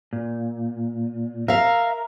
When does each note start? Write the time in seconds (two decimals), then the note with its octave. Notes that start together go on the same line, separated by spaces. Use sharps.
0.13 A#2
1.48 A#4 E5 F5